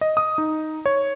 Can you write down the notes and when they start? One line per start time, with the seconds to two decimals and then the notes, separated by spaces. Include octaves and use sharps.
0.01 D#5
0.17 D#6
0.38 D#4
0.86 C#5